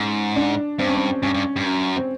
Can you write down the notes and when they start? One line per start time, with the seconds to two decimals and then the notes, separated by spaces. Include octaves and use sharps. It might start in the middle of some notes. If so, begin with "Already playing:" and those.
Already playing: G#2 C#4
0.36 D4
0.79 G2 C4
0.87 C#4
0.95 C4
1.23 G2 C#4
1.34 G2
1.56 G2
1.66 F#2
1.97 C4